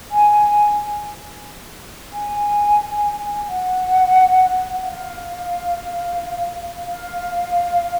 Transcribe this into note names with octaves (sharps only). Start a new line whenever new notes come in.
G#5
G#5
F#5
F5
F5